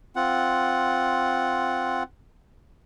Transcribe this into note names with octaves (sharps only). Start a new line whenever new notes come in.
C4 F4 F#5